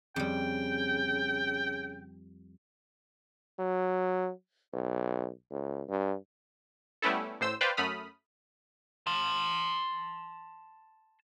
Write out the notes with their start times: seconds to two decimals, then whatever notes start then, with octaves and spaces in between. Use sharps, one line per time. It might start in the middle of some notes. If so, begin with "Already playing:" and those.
0.16 F2 C#3 G3 G5
3.59 F#3
4.73 B1
5.51 C#2
5.89 G2
7.02 G3 A3 B3 C#4 E4 A4
7.40 A1 A2 C5 E6
7.61 B4 C5 D5 F5 G5
7.77 F#2 A3 B5 D#6 F6
9.07 A5 C6